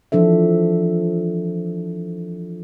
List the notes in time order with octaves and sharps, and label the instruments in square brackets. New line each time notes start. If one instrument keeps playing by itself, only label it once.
[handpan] E3 F3 D4 A4 E5